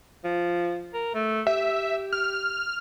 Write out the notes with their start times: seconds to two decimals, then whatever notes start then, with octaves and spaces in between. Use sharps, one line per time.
0.24 F3
0.93 A#4
1.14 A3
1.47 G4 E5
2.13 F6